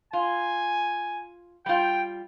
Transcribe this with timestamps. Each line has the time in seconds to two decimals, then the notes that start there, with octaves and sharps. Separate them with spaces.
0.13 F4 G#5
1.66 G3 F4 G5